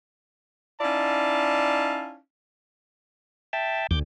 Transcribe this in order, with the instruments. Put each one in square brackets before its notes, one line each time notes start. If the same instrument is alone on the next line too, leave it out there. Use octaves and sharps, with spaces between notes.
[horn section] C#4 D#4 E4 D5 F5 A5
[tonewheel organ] E5 G5 A5
[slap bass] D2 [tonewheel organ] D6 G6